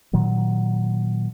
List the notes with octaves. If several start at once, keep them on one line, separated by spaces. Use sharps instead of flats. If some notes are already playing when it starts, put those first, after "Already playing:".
A#2 D#3 F#3